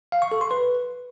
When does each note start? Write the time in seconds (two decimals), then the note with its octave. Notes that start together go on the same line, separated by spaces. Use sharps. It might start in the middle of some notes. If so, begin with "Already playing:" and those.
0.12 F5
0.22 C#6
0.32 A4
0.41 C6
0.51 B4